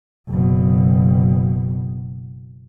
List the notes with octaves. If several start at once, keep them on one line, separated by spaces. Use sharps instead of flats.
F#1 B2